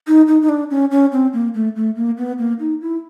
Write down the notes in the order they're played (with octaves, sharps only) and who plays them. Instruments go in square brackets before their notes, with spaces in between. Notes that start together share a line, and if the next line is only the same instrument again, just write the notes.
[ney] D#4
D#4
D#4
D4
C#4
C#4
C4
A#3
A3
A3
A#3
B3
A#3
D#4
E4